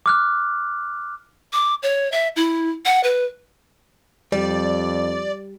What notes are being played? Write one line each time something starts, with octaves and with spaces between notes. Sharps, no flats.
D6 F6 F#6
D6
C#5
E5
E4
F#5
B4
F2 G3 D5